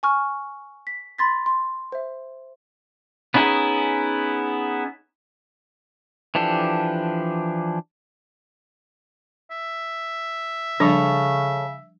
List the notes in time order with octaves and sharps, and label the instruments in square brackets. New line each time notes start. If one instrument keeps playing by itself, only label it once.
[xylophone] G#5 C#6 F6
B6
B5 C6 A6 B6
C6
C5 E5
[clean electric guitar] B3 C#4 D#4 E4 G#4
[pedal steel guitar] E3 F3 D4 G4 A4
[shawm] E5
[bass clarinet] C#3 [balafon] F3 G3 D4 [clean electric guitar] A4 C#5